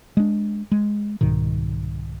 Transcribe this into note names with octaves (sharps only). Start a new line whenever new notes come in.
G#3 D4
G#3
C2 G#2 B2 D#3